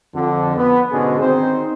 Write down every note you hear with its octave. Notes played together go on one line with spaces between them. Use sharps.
F2 D3
B3
G#2 B2 D3 G#3 C#4 G#4
D#3 C4 D#4 C5